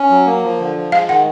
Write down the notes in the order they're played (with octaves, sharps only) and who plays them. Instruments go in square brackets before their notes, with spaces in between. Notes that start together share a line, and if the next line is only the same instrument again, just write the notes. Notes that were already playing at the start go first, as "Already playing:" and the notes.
Already playing: [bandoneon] C#4
F#3
A#3
F3
D3
F3
[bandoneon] G#3 [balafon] F5
[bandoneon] D#3 [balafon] F#5